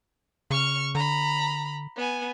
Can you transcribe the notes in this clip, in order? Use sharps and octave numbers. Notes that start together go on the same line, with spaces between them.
C#3 C#6 F6
D3 A#5 B5
B3 G#5